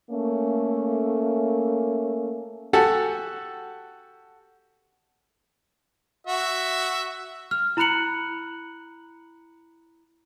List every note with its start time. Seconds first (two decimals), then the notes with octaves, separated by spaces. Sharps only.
0.11 A3 A#3 C#4
2.73 F#4 G4 A4 F#5 G#5 A5
6.27 F#4 E5
7.51 F6
7.77 E4 A#5 B5 F#6 C#7 F#7